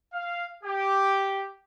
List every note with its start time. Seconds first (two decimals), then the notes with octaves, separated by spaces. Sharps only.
0.13 F5
0.63 G4